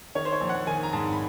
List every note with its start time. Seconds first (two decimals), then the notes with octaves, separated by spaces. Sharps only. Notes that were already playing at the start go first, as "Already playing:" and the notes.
0.15 D#3 C#5
0.25 C5
0.32 C#5
0.41 A#1
0.49 F#5
0.67 D#3 G#5
0.83 A#5
0.93 G#2 A5
1.13 B5